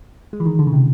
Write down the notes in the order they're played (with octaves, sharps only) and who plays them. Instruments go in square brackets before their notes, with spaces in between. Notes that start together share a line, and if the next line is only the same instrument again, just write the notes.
[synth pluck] G#3
E3
D#3
D3
C#3
C3